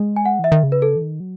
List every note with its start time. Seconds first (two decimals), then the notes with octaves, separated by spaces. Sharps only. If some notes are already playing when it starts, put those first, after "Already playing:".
Already playing: G#3
0.16 G#5
0.25 F#5
0.39 E3 E5
0.52 D#3
0.63 C#3
0.72 B4
0.82 A4
0.96 E3
1.01 D#3
1.20 F#3